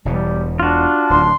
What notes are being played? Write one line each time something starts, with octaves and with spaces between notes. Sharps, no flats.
E1 E2 B2 G3
D4 F4 F#4
D1 D#2 C6